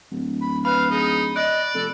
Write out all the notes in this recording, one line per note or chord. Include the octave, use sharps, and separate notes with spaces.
D1
B5
B4 F5 B5
D#4 G#4
D5 D#5 F#6
F1 A4